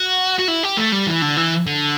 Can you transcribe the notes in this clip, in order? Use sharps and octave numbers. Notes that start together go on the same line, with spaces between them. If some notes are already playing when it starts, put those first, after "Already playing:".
Already playing: F#4
F#4
E4
G4
A3
G3
E3
D3
E3
D3